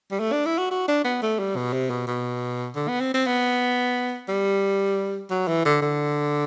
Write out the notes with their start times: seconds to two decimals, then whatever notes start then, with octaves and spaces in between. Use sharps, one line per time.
0.11 G3
0.20 A3
0.32 D4
0.46 E4
0.58 F#4
0.71 F#4
0.88 D4
1.04 B3
1.22 A3
1.39 G3
1.56 B2
1.73 C3
1.90 B2
2.07 B2
2.76 D3
2.88 B3
3.01 C4
3.14 C4
3.27 B3
4.29 G3
5.30 F#3
5.48 E3
5.65 D3
5.82 D3